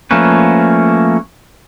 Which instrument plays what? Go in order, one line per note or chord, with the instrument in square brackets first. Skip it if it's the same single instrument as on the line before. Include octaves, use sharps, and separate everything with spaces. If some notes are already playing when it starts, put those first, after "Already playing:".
[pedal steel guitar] F3 A3 A#3 C#4 B4